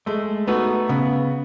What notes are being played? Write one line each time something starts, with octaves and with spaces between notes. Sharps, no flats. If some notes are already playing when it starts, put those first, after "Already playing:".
G#3 A3
A3 B3 D#4 F#4
C#3 B3